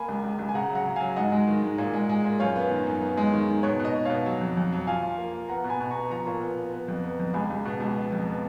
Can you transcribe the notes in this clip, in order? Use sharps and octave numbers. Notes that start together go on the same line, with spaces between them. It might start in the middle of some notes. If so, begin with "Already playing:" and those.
Already playing: A#3 G#5 B5
C#2
C#2
C#2
G#5
C#3 F#5 A#5
F#3 F#5 A#5
C#3
F#3 F5 G#5
G#2 D#5 F#5
G#3
D#3
G#2
A#2
G#3
G#3
A#2
F#2 C#5 F5
B3
D#3
F#2
B3
G#3
D#3
D#3
B2 C#5
B2
D#5
B2
B2 C#5 F5
F#3
F2
F2
F#3
F3 F5 G#5
F3
A#3
A#3
B3 F#5 A#5
B2
G#5 B5
B2
A#5 C#6
B3
F3 A#5 C#6
A#2
B3
B3
B3
F2
B3
F2
C#2 G#5 B5
C#2
B2
C#2
B3
F2
B3